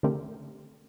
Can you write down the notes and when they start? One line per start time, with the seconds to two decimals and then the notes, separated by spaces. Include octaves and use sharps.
0.03 D3 A3 C4 G4 A#4